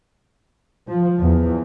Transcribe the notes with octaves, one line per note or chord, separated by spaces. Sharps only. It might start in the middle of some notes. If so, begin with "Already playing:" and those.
F3
E2